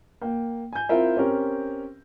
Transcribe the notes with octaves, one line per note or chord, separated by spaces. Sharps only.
A#3 G5
G#5 G6
C4 E4 F4 A#4 E5
C4 C#4 G4 A#4